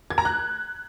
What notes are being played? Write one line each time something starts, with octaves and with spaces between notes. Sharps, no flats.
G#6
A#5
F#6